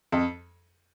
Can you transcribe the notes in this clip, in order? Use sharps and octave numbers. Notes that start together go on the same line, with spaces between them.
F2